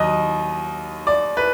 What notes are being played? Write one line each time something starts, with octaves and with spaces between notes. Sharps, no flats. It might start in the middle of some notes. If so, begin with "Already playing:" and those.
Already playing: D#2 F#3 D#5
D5
B4